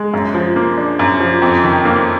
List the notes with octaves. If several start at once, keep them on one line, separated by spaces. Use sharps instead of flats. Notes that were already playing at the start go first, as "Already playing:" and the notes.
Already playing: G#3
F#2
F3
A#3
D4
F#2
F3
F2
D#3
A#3